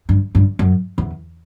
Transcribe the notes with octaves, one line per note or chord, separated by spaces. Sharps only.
G2
G2
F#2
E2